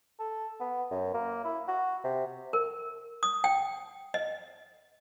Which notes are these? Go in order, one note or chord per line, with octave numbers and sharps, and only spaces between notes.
A4
B3
F#2
A#3
E4
F#4
C3
A#4
D#6
G5
D#5